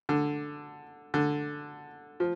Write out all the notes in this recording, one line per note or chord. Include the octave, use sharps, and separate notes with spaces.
D3
D3
F3